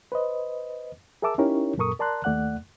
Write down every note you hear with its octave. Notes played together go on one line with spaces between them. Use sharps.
B4 C5 D#5
G#4 A#4 E5 A5 D6 E6
C#4 D#4 E4 G4 A#4 C#5
F#2 A#2 A4 A#4 C#6 D#6
A#4 D5 A5 A#5 C6 F#6
D#2 A3 D5 F#5 F#6